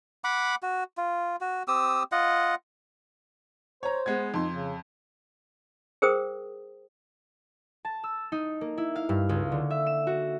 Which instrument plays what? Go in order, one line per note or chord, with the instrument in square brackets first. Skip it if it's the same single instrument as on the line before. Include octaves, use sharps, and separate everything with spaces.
[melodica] F#5 B5 D6
F#4
F4
F#4
C4 G4 D#6 E6
F4 D#5 F#5
[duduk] C5 [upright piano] C#5 A#5
[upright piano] G#3 B3 G#6
[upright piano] F2 C6 [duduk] D#4
[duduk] C#3
[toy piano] G#4 A#4 C5 G5 D#6
[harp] A5
E6
D#4
A#3
E4
F5
G2
C#2
D3
E5
E7
F#4